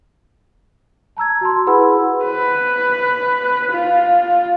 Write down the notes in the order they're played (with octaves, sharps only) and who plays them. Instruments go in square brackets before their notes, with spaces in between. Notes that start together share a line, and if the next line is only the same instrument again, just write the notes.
[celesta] A5 A#5 E6 G#6
F#4 A5 C6
E4 G#4 B4 F#5 B5 E6
[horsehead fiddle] B4
F4